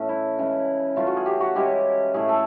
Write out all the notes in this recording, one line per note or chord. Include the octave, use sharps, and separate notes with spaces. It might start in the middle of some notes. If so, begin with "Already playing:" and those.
Already playing: A2 E3 A3 C#4
E4
C#3 E3 G#3
C#3 E3 A3 C#4 F4
F#4
G#4
G4
F#4
E3 G#3 C#4 E4 G4
A2 E3 A3 G#4
A4